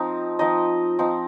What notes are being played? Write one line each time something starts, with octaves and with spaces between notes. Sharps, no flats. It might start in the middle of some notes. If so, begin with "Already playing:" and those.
Already playing: F3 C4 D#4
F3 C4 D#4 D#5
F3 C4 D#4